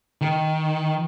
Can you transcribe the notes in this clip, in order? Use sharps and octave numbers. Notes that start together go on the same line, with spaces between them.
D#3